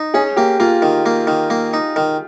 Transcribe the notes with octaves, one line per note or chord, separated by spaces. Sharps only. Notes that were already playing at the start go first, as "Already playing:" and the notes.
Already playing: D#4
C#4 G#4
A#3 G4
A#3 F4
D#3
A#3
D#3
A#3
D#4
D#3